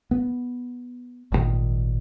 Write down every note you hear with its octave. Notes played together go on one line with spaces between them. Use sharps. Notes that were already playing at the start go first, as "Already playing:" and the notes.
B3
G#1 G2 A#2 D#3